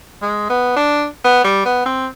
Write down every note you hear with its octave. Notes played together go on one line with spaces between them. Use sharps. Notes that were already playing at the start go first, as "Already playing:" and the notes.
G#3
B3
D4
B3
G3
B3
C4